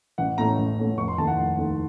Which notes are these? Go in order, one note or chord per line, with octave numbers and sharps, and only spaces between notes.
A1 F#5
A2 A3 C#4 A#5
A1
A2 A3 C#4
F1 C#6
C6
D#2 D#3 A3 A5
F#5
F1
D#2 D#3 A3